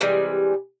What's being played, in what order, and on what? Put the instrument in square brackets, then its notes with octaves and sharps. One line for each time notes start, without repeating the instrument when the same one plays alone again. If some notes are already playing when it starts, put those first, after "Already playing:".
[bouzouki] C3 E3 G3 G#3